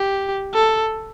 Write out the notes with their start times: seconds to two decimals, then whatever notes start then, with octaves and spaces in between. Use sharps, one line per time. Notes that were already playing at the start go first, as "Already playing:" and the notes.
Already playing: G4
0.54 A4